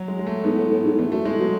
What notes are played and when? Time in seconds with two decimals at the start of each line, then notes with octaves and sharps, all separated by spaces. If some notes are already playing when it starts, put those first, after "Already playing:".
Already playing: F#3
0.08 G#3
0.19 G#3
0.27 A3
0.44 G#2 B3
0.57 A2
0.71 A2
0.85 G#2
0.98 E2 A3
1.12 F#2 A3
1.25 A2 G#3
1.39 B2 F#3